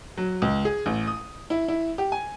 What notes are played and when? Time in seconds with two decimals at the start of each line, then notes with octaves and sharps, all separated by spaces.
0.17 F#3
0.42 C#2
0.65 G#4
0.86 A1
1.07 D#6
1.50 E4
1.68 E4
1.98 G4
2.12 G#5